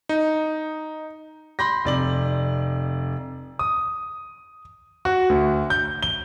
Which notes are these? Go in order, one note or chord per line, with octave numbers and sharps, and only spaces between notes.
D#4
B5 C6 G6 A#6
F1 D5 F#7
D#6
F#4
D2
G6
G7